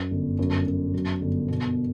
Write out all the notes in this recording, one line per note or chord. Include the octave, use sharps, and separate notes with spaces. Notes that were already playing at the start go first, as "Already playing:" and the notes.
Already playing: F#2
G1
F#2
F#2
F#3
G1
B2